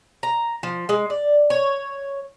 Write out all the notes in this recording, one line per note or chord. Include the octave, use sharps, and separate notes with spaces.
A#5
F3
G#3
D5
C#5